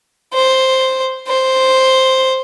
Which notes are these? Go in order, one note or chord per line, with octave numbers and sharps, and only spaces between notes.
C5
C5